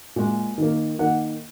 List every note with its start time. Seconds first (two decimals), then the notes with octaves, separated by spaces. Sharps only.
0.16 A#2 G#3
0.58 D#3 A#3
0.99 D#3 A#3 F#5